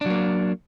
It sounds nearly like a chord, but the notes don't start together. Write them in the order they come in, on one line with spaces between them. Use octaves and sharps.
D4 F#3 A#3